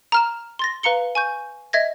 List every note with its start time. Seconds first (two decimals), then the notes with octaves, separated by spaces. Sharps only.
0.12 A#5 F6 E7
0.59 C6 A6 A#6
0.83 B4 F5 A#5 C#7 G7
1.15 G#5 C#6 G6
1.73 D#5 E5 G#6 A#6